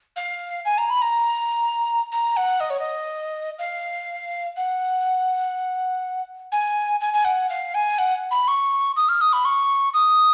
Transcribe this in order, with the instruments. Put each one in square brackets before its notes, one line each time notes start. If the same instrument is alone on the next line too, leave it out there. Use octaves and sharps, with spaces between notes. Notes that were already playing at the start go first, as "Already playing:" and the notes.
[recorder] F5
G#5
A#5
B5
A#5
A#5
F#5
D#5
C#5
D#5
F5
F#5
G#5
G#5
G#5
F#5
F5
G#5
F#5
B5
C#6
D#6
F6
D#6
B5
C#6
D#6